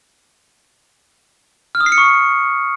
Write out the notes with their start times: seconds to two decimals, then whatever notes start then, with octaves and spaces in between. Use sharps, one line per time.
1.75 F6
1.81 D#6
1.86 C7
1.92 C#7
1.98 C#6